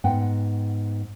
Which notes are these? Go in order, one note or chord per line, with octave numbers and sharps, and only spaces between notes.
G#2 B3 F#5 G5